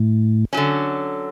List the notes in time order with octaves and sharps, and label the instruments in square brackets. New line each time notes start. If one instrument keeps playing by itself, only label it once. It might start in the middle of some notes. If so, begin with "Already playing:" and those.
Already playing: [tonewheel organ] A2
[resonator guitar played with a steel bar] D3 F#3 C#4